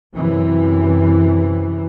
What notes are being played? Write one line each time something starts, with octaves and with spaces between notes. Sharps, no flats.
F#2 C3 E3